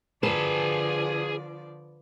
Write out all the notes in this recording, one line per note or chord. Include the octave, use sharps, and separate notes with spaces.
D3 F3 G#4 B4 D5 A5